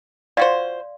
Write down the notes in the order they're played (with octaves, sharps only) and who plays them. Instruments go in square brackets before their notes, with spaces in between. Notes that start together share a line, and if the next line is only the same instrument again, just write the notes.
[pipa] F4 F#4 C5 [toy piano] D5 F5 C6